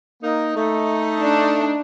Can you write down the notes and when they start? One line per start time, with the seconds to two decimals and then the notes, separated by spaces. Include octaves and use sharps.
0.23 A#3 D#4
0.56 A3 D#4
1.21 D4